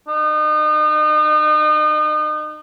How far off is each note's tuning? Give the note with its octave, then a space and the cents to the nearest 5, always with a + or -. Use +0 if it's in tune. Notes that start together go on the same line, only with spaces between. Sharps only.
D#4 -35